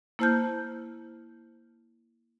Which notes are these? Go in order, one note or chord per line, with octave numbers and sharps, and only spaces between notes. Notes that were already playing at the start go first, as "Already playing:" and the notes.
A#3 E4 C5 A5 F6 G6